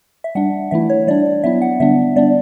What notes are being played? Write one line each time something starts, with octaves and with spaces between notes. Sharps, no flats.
E5
G3 D4 F#5
E3 A3 E4 E5
C#5
G3 D4 D5
F#3 B3 E4 E5
F#5
D3 G3 B3 D4 E5
G3 B3 D4 D5